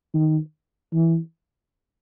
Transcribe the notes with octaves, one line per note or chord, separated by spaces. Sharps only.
D#3
E3